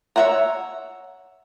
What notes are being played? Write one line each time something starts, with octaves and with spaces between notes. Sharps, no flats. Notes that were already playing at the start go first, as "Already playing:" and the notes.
C#5 D#5 E5 F#5 A#5